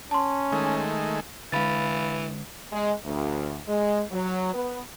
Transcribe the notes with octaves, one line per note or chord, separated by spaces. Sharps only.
C#4 A5 C6
D#3 G#3 A3
D3 E3 G#3 F5 B5 A6
G#3
D2
G#3
F#3
B3